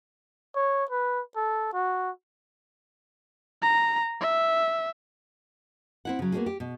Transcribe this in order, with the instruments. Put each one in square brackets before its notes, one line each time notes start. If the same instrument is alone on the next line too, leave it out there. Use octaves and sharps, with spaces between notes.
[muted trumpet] C#5
B4
A4
F#4
[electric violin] A#5
E5
[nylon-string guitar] C4 E4 F#5
C#3 F#3
A#3 B3 C#4 D4 F#4 G#4
G4
B2